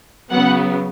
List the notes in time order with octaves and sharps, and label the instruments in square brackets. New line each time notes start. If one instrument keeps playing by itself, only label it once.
[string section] C#3 F#3 B3 F#5